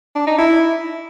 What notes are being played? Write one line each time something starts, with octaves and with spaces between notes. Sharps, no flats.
D4
D#4
E4